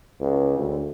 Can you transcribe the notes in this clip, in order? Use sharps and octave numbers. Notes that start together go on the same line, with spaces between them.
C#2
D2